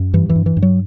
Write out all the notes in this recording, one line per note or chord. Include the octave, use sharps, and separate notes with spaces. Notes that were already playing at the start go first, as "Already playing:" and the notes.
Already playing: F#2
G2 E3
E3
G2
E3
G2
F#3